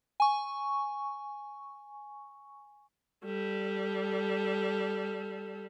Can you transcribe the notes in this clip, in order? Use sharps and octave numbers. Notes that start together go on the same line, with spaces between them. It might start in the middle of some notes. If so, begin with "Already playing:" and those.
G#5 C#6
G3 A4